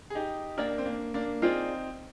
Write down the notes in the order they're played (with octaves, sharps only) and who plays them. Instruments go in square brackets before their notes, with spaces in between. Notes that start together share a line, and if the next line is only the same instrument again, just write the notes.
[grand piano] G#4
D#4 G4
[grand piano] A#3 D4 [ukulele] A#4 D5 G5
[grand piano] C4
A#3 D4
A#3 D4
[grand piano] C4 D#4 [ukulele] F4 G#4 D5